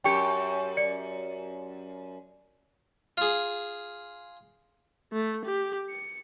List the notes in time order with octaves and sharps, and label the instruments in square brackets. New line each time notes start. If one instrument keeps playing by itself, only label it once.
[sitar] F#2 G4 [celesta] G5 C#6 C#7
[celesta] D5 C#7
[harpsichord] F4 G#4
[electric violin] A3
G4
C#7